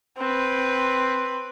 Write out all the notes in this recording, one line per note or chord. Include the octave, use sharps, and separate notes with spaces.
C4 B4